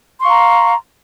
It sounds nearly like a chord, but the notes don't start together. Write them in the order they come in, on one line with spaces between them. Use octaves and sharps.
C6 C#6 F5 A#5